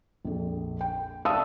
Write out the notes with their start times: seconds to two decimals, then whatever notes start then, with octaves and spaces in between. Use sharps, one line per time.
0.25 A#1 F2
0.81 G5
1.25 D5 E5 F5 A5 D#6 E6